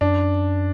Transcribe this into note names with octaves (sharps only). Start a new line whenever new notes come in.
F#2 D4